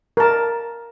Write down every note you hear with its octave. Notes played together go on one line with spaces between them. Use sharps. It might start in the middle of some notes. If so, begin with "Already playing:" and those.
A#4 A5